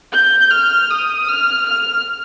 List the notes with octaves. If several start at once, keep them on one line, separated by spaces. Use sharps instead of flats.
G6
F6
D#6
F6
F6